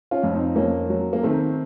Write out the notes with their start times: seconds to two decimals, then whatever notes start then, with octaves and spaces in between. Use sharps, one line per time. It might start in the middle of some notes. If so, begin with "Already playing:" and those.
0.11 C#4 F4
0.23 F2
0.34 C4 D#4
0.56 F2 A#3 C#4
0.90 F#3
1.13 A#3
1.23 D#3 A3 C4